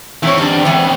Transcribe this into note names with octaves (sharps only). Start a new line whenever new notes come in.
E2 C4 E4 C#5
G3 D4
G5
E3 B3